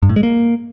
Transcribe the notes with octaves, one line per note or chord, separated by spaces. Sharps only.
G2
A2
G#3
A#3